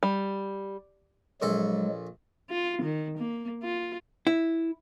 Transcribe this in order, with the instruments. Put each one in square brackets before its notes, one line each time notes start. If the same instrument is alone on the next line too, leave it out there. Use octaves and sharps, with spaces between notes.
[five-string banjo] G3
[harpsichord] A#1 A4 [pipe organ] F#3 G#3
[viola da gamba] F4
D#3
A#3
F4
[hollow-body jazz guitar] E4